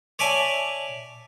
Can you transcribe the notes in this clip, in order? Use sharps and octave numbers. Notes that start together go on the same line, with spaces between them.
C#5 D5 E5 G#5 A5